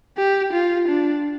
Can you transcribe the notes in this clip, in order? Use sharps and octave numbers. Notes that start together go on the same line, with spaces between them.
G4
F4
D4